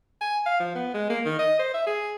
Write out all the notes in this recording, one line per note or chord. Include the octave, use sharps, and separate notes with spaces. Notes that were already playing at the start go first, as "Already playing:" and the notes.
G#5
F5
F3
B3
G#3
A#3
D#3
D#5
C5
E5
G#4